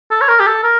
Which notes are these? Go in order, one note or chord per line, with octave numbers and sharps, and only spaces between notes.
A4
C#5
A#4
G4
A4
A#4